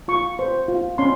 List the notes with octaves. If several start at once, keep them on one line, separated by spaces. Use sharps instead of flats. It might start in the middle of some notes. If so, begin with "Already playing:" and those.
F4 C#6
C5
F4
C#4 C6